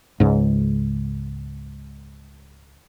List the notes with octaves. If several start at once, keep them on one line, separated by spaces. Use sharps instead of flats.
C#2 G#2